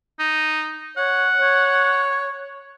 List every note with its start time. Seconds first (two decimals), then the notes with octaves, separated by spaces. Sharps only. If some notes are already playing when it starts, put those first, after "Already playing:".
0.20 D#4
0.97 C#5 F#5
1.41 C#5